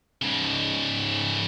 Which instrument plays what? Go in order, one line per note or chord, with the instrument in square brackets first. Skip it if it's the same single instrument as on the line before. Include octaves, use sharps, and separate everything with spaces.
[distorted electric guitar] G#2 C#3